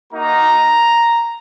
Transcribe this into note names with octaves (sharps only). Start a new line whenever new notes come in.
A#3 D#4 F#4 A#5